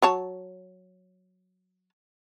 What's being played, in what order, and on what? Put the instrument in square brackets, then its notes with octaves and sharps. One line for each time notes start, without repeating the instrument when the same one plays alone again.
[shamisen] F#3 C#5 A5